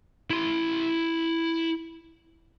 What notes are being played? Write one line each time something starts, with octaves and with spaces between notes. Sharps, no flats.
E4 C6